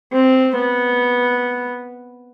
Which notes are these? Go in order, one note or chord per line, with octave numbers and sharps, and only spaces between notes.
C4
B3